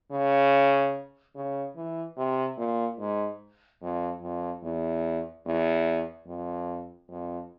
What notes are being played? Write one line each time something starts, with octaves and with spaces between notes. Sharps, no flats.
C#3
C#3
E3
C3
A#2
G#2
F2
F2
E2
E2
F2
F2